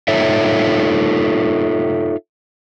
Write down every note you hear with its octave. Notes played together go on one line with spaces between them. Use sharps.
D#4 F4 A4 C#5 E5